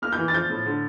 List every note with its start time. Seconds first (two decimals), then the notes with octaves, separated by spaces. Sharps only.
0.02 A#3 F6
0.12 G6
0.18 E3
0.28 A6
0.33 F3 G6
0.50 A2
0.66 D3